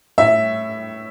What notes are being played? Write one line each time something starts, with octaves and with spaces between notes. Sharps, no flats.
A2 E5